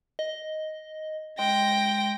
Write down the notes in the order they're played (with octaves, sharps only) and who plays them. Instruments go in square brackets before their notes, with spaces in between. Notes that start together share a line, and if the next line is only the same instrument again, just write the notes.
[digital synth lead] D#5
[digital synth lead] G#3 [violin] G5 A#6